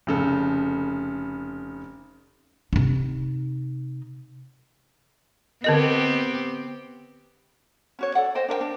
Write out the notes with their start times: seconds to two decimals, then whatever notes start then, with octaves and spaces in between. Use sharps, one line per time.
0.07 F1 C#3 A4
2.73 C3 D#4
5.64 D3 B3 C4 G4 A#4 D#5
7.99 C#4 F#4 C#5
8.15 A4 D5 F#5
8.35 C5 D#5 G5
8.48 D4 A#4 D#5 G5
8.61 D4